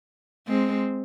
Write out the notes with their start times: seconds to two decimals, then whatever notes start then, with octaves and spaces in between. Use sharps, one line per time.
0.48 G#3 C4